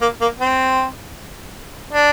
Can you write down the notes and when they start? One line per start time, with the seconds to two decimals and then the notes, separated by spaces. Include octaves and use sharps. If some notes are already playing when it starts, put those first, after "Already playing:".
0.01 A#3
0.21 A#3
0.40 C4
1.93 D4